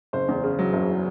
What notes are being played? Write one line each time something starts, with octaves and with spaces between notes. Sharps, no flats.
F#1 C5
E2
C#3
F#3
F#1